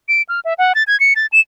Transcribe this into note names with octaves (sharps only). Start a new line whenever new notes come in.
D7
F6
E5
F#5
A6
G#6
C#7
A6
E7